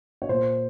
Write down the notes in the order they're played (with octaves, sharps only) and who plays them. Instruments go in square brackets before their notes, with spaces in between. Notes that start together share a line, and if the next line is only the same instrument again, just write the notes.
[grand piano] C#5
A#2 C5